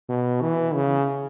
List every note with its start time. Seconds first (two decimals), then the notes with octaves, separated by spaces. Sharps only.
0.09 B2
0.42 E3
0.74 C#3